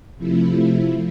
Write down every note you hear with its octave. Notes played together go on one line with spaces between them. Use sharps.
C3 F3 A3 E4
F3